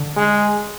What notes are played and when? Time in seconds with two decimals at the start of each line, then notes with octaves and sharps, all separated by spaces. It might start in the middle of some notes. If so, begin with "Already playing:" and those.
Already playing: D3
0.17 G#3